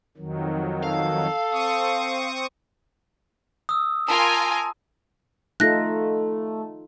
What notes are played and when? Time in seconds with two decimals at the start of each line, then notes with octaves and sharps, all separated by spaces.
0.17 F2 D#3 F#3
0.83 A4 F5
1.52 C4 C#6 D#6
3.69 D#6 E6
4.08 F4 A#4 G#5 A5
5.60 A3 D#4 F4 A4 F#6 A#6